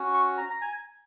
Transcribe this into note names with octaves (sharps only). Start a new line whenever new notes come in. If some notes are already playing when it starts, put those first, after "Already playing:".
Already playing: C#4 F#4
C#6
A#5
A#5
G#5